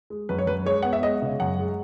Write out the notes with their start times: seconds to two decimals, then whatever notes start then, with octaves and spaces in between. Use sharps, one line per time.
0.10 G#3
0.29 F#2 B4
0.38 C#5
0.47 F#2 B4
0.66 G#3 C#5
0.83 B3 F#5
0.93 E5
1.03 G#3 D#5
1.22 C#3
1.40 F#2 F#5
1.59 G#3